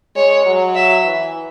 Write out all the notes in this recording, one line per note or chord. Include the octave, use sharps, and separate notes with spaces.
G#3 C#5
F#3
E5
E3